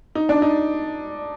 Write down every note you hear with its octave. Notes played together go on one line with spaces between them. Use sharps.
D#4
D4
D#4